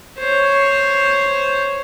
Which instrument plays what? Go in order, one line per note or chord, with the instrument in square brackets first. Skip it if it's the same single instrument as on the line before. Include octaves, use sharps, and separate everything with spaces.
[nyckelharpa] C5 C#5